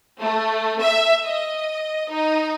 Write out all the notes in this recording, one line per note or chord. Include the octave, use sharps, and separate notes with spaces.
A3
E5
D#5
D#4